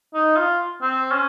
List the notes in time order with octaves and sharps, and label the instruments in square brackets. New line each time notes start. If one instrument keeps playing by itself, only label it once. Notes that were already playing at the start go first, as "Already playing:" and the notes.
[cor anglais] D#4
F4
C4
C#4